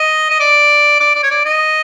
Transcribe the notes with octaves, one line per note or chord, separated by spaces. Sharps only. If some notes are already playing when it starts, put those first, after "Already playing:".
Already playing: D#5
D#5
D5
D5
D5
C#5
D5
D#5